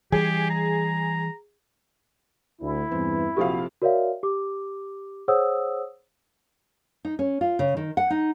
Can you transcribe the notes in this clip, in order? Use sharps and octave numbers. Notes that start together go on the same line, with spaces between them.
E3 G3 G4 G#4
A#5
D2 E4
E2 G2 E3 C4
A#1 C3 F3 F#4 G4 A4 F5
F#4 A#4 C#5 D5 E5 F5
G4 D6
G#4 C5 C#5 F#5 D#6 E6
D#4
C#4
F4
C#3
D#3
F#5
D#4